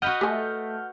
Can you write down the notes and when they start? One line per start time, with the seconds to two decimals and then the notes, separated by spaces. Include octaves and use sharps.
0.02 F#4 B4 D#5 F#5 F6 G6
0.21 A3 G4 G#5